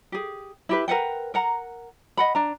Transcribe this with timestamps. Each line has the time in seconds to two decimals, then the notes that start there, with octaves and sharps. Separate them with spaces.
0.12 G4 G#4
0.69 E4 G4 B4
0.88 A#4 B4 F#5 G5
1.34 A#4 F#5 A#5
2.17 D#5 F#5 B5
2.35 D4 A#5